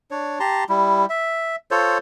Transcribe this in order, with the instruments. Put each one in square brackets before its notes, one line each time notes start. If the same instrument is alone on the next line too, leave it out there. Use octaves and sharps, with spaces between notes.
[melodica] D4 C#5
G4 A5 A#5 C6
G3 E4
E5
F4 A4 C5 C#5